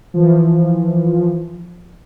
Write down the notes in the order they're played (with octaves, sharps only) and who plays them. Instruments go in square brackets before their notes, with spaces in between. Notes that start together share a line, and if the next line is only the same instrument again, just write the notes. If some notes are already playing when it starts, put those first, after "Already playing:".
[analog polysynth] E3 F3